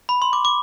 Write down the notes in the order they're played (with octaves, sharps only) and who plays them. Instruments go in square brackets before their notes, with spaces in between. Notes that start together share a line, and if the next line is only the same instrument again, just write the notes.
[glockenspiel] B5
C6
D6
D6